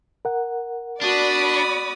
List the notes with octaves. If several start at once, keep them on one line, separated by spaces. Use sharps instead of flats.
A#4 F#5
D4 F#4 D5 B5 D#6